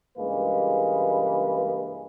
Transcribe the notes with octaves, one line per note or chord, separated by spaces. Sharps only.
C#2 G2 E3 G#3 A#3 B4